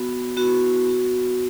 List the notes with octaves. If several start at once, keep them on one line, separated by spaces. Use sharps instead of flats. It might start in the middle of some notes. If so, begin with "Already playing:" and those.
Already playing: B3 F#4
B3 E4 F#4
B3 F#4